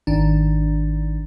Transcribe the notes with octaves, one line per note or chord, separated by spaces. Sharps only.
G#1 D#3 D4